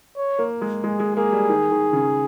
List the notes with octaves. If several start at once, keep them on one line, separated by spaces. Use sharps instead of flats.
C#5
A#3
G#3
G#3 G#4
G#3
A#3 G#4
G3
D#3
D#3
C#3